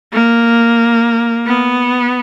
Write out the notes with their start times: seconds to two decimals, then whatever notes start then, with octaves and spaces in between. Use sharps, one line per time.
0.13 A#3
1.47 B3